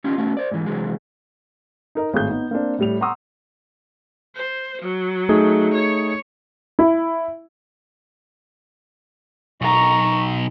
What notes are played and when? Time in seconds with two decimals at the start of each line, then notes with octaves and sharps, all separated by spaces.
0.04 C#4 D#4 F4 G4
0.18 A3 B3 C#4 F#4
0.37 C5 D5
0.51 G#2 E3
0.66 C3 E3 F#3 G#3
1.95 D#4 A#4 D#5
2.14 G#1 A2 G#4 G6
2.29 B3 D#4
2.51 A#3 C4 D4
2.79 A2 G3 F7
3.01 F#5 A#5 C6 C#6 D#6 E6
4.35 C5
4.82 F#3
5.29 A3 D#4 G#4
5.74 C#5
6.79 E4
9.62 B1 D#4 A#5 C#6